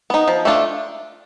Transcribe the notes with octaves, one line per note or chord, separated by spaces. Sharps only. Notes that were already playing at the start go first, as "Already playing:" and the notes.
B3 D#4
F3
A3 D4 F4